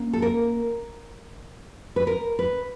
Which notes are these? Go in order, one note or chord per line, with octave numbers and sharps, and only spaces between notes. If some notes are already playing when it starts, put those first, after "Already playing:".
Already playing: A#3 C#4
A4
A#4
B4
A#4
B4